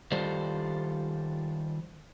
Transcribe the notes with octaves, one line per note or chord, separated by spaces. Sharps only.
D#3 G3 F4 A4 C5 D5